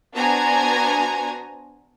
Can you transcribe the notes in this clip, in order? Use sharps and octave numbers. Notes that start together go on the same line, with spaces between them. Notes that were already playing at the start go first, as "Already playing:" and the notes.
B3 D4 F#4 C5 G#5 A#5